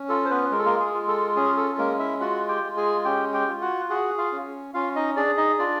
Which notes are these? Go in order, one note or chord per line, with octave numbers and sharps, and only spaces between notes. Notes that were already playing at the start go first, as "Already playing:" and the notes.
Already playing: C#4
F4 A4
C5
B3 B4
G#3 A#4
A4
A#3 A#4
G#4
F4
A4
C#4 G#4
A4
G#3 A#3 A#4
E4 E5
F4 F#4 F#5
G4 G5
G#3
G#4 G#5
C#4 G4 G5
G4 G5
F4
F#4 F#5
F#4 G#4 F#5
F4 F5
C#4
C#4 F4 F5
D#4 D#5
D4 G#4 D5
D#4 D#5
D4 F4 D5